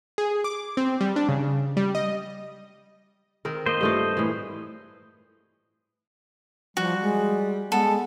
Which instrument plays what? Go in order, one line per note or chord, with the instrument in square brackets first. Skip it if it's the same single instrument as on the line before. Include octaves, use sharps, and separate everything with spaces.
[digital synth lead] G#4
D6
C4
G3
D4
C#3
G3
D#5
[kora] D#3 C4 A#4
[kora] A#3 [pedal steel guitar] C5 D#5
[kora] G2 A3 F4
A2 E3
[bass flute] F3 [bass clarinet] G3 [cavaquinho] F#4
[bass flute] G#3
[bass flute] G#3 [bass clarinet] B3 [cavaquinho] A4